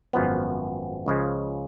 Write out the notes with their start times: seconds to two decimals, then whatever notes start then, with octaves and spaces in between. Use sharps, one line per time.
0.13 G#1 F#2 F3 B3
1.06 C#2 C#3 F3 G#3